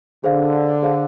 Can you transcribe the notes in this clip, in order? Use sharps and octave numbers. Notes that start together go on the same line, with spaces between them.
D3 G#4 C5 F5
G#4 C5 F5